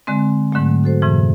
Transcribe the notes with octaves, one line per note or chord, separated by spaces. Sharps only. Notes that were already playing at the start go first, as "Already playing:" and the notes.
D3 G#3 C4
G#2 D3 F#3 A3
F#4 A4 C5
F2 G#2 C3 E3